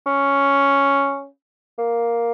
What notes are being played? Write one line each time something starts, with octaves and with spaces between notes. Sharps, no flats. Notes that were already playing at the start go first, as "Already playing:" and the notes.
C#4
A#3